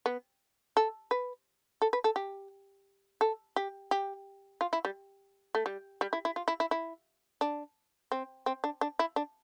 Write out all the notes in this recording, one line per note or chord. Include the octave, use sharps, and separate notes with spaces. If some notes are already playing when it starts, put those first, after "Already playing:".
B3
A4
B4
A4
B4
A4
G4
A4
G4
G4
F4
E4
G3
A3
G3
G3
E4
E4
F4
E4
E4
E4
D4
C4
C4
D4
D4
E4
D4